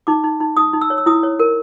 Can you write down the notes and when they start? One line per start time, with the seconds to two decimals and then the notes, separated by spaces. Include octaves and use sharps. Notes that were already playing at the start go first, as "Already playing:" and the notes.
0.07 D#4 D6
0.24 D#4
0.40 D#4
0.57 D#4 D#6
0.73 D#4
0.81 E6
0.90 C#5
0.98 E6
1.06 E4 D#6
1.23 C#5
1.39 A#4